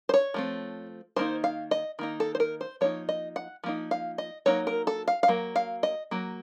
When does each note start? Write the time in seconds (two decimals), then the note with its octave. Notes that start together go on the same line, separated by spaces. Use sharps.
0.09 C5
0.14 C#5
0.34 F3 A3 C4
1.16 D#3 A#3 D#4 C5
1.44 F5
1.71 D#5
1.99 D#3 A#3 D#4
2.20 A4
2.35 C5
2.40 A#4
2.61 C5
2.81 F3 A#3 D#4 C#5
3.09 D#5
3.36 F#5
3.64 F3 A#3 D#4
3.91 F5
4.18 D#5
4.46 F#3 A#3 D#4 C#5
4.67 A#4
4.87 A4
5.08 F5
5.23 F5
5.28 F#3 A#3
5.56 F5
5.83 D#5
6.11 F#3 A#3